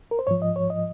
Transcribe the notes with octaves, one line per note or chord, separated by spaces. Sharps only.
A#4
C5
G#2 F3 C#5
D#5
C#5
D#5